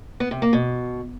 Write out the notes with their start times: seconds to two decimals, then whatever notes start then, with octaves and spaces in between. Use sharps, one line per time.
0.20 B3
0.31 C3
0.42 A#3
0.53 B2